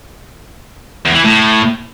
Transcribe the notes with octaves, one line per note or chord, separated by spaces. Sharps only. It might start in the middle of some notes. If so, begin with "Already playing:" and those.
E2
E3
A2